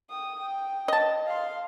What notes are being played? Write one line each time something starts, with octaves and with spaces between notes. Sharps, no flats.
G5 D#6
G5
D#5 A5
F5 C6